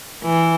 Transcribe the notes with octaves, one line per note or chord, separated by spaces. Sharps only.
E3